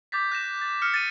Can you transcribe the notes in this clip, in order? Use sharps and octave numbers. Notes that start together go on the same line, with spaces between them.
D6 G6 A6 B6
F#6 A#6 E7
A6
D#6 F6 C#7
A6 D#7